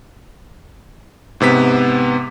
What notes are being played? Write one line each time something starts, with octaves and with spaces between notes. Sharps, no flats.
G#2 C3 B3 B6